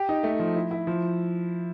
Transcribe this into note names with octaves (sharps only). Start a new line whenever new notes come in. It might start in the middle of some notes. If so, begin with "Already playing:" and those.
Already playing: G4
D#4
A3
F3
E4
E4
F3